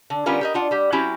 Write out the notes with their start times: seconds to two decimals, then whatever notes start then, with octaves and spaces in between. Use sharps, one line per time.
0.10 D3
0.26 D3 G3 B3 C#4 F4 A#4
0.41 G4 A#4 D#5
0.54 D4 F4 F#5
0.71 G3 G4
0.92 F#3 C4 C#4 E4 F#4 G4